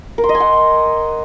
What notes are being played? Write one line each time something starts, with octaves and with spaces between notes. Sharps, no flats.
A#4
C6
D#5
G#5
F#5